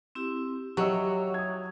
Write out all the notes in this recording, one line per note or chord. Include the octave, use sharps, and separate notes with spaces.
C4 E4 G4
F#3 G4 C#5 D#5 E5 F#5 E6
D#6 G#6